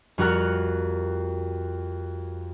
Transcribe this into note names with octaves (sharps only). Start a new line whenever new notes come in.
F2 G3 F#4 A#4 F#5 F6